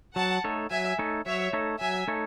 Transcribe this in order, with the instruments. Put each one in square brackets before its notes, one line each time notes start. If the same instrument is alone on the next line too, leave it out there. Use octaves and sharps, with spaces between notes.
[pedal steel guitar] F#3 [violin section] F#5 A5
[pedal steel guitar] A3 D#4 A4 C#5
[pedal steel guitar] F#3 [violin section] E5 G#5
[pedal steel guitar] A3 D#4 A4 C#5
[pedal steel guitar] F#3 [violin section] C#5 E5
[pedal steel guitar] A3 D#4 A4 C#5
[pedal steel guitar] F#3 [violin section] E5 G#5
[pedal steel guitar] A3 D#4 A4 C#5